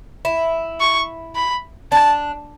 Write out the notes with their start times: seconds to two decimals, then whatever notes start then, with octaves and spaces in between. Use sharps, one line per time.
0.25 E4
0.80 C#6
1.36 B5
1.92 D4 A5